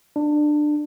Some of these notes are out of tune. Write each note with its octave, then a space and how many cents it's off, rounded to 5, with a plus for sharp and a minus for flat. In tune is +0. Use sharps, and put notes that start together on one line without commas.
D4 +20